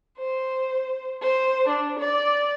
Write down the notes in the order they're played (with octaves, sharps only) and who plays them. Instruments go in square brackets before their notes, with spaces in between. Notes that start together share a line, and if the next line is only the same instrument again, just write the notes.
[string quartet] C5
C5
D4
D5